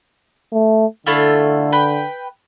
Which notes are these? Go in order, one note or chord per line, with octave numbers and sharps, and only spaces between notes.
A3
D3 A3 E4 F4
B4 G5